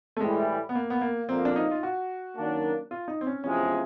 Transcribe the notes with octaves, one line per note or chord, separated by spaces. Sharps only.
A3
A2 E3 G3 G#3
B3
A#3
B3
A#3
F2 D3 F3 A#3 C4
D4
D#4
F4
F#4
F#2 D#3 F#3 A#3 D4
F4
D#4
C4
C#4
E2 C3 F3 G#3 C#4